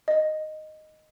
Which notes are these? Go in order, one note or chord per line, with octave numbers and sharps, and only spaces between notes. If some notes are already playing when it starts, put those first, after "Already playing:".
D#5